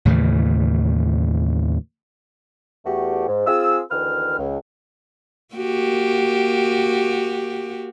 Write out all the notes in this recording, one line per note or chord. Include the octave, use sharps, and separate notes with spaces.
D#2 A2 C#3 E3
E2 A3 F#4 G4
G#2
C4 F4 G#4 E6
D2 D#3 E3 B4 F6
C#2
A#3 F#4 G4